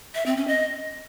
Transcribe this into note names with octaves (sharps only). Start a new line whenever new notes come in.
E5
C4
C#4
D#5